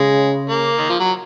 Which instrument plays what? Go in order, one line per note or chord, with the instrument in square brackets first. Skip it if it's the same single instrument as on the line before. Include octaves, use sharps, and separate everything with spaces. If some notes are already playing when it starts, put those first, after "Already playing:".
Already playing: [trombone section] C#3 [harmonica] G#3
[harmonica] A#3
D#3
F3
F#3